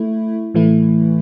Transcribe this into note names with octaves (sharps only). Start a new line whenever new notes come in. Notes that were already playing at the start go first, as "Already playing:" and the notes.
Already playing: A3 E4
A2 E3 A3 E4